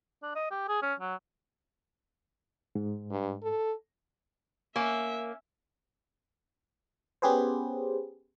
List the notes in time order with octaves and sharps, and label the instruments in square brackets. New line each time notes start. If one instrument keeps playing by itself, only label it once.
[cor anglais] D4
D#5
G4
G#4
C#4
F#3
[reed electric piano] G#2
[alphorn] G2
A4
[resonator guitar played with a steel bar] A#3 [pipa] C#4 [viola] E5
[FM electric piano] B3 C#4 G4 G#4 B4 C5